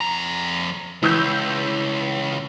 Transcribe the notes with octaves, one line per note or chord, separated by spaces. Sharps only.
F2 A#5
C#2 E3 E6 G6